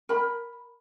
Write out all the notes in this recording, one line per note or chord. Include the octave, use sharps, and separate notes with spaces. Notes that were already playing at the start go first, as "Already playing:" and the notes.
A#4 B5